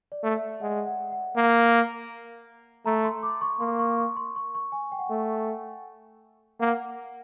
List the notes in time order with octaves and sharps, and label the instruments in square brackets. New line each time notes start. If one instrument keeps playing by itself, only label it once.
[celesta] D5
[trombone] A3
[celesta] E5
[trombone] G#3 [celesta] F#5
[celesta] F#5
F#5
[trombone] A#3
[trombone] A3 [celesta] A#5
[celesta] C6
D6
C#6
[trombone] A#3 [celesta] C6
[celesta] C#6
C#6
C6
C#6
C#6
G#5
G5
F#5
[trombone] A3 [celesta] G5
[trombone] A#3 [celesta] F#5